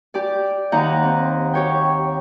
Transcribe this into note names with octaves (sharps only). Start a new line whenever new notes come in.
G4 D5
D#2 D#4 F#5 A#5 G6
C4
G4 C#5 G5